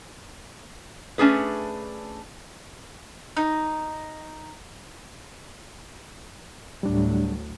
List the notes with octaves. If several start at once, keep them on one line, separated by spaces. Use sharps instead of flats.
A3 C#4 D4 G#4 B4
D#4
D2 A2 F#3 G3 D4